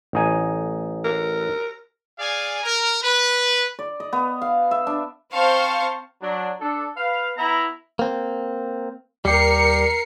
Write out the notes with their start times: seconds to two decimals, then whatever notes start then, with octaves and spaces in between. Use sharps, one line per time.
0.13 A1 D#4 G#5
1.04 A#4
2.19 G#4 D5 F5 G#5
2.63 A#4
3.02 B4
3.79 D5
4.00 D#5
4.13 B3
4.42 F5
4.71 E5
4.87 D4
5.33 C4 C5 F5 A5 C#6
6.22 F#3 D4
6.61 D4 A4
6.97 B4 F5
7.37 B3 E4 A#5
7.99 A#3 C4
9.25 D#2 G3 G4 A#4 C7 C#7